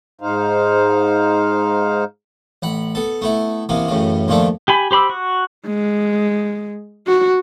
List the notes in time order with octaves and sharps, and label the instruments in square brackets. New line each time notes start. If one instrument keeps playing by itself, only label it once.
[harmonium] G#2 D#4 C5 F5
[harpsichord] A1 F#5 B5
B3 A4
A3 B3 E4
C3 E3 A#3 B3
F#2 A2 C#3 E3
D#2 A#2 F3 A3 D4 E5
[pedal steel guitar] G4 G#5 B5
G4 C5 B5 D6 E6
F#4
[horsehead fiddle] G#3
F#4